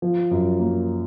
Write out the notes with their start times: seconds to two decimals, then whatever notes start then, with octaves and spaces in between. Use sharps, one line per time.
0.02 F3
0.31 F#2
0.60 A#3